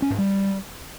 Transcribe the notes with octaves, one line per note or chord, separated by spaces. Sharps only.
C#4
G#2
G3